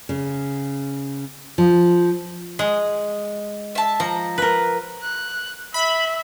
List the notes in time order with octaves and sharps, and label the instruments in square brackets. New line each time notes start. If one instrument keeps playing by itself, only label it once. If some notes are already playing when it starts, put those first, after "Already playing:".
[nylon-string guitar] C#3
F3
[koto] G#3 [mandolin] D#6
[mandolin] E5 A5
[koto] F3 [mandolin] A#5
[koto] A#4 B4
[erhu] F#6
[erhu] E5 [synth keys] B5